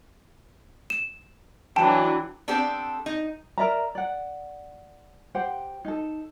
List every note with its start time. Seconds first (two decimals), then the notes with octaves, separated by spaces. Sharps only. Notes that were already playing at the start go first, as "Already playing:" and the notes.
0.90 E7
1.76 E3 F#3 D4 G5 A5
2.48 B3 C4 D4 G4 A4
3.06 D#4
3.58 A#4 D5 E5 A#5
3.95 D5 F#5
5.35 G4 C5 F#5 G5
5.85 D#4 A4